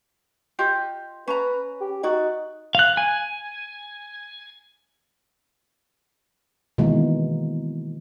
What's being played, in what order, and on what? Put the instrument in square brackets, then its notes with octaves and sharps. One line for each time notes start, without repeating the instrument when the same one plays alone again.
[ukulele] F4 G4 D#5
[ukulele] C#4 A#5 [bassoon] B4
[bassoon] G4
[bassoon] D#4 [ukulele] F#4 D5
[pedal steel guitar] F5 F#6
G#5
[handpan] B2 D#3 E3 G#3 A#3